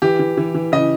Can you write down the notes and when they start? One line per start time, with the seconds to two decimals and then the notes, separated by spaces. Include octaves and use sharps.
0.02 E3 G4
0.19 E3
0.37 E3
0.55 E3
0.72 C#3 D#5